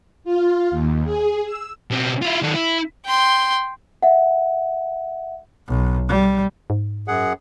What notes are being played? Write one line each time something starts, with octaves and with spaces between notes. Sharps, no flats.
F4
D#2
G#4
E6
B2 C4
E4 F4
D#3 A4
E4
G5 C6
E5 F#5
B1
G3
G#2
F#2 G#4 F#5